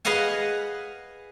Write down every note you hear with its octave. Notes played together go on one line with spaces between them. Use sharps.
G#4 B4 D#5 F5 F#5 G#5